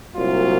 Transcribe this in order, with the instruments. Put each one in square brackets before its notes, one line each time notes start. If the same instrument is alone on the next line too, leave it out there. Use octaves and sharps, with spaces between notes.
[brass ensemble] C2 A#2 F#3 F4